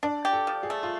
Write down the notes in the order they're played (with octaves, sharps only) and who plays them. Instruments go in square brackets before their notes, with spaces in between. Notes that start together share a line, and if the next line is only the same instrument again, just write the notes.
[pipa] D4 [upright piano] D5
[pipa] G4
[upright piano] A4
[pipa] F3
[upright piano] G#4
[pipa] A3
[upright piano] F4